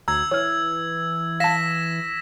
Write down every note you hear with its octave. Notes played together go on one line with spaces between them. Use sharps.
D2 A#5 E6 G#6
E3 C#5 F6
F5 A5 A#6 B6 E7